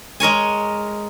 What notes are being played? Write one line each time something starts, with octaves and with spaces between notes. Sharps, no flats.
G#3 A#4 C#5 G#5